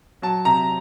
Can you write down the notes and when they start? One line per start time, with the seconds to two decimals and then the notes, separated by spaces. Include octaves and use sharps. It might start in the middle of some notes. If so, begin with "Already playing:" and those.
0.22 F#3 A5
0.45 C3 A#5